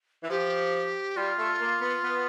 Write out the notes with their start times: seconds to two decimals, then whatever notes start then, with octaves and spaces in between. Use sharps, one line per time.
0.23 E3
0.30 F3 G4
1.17 G3 F4
1.39 A3
1.60 A#3
1.81 B3
2.03 B3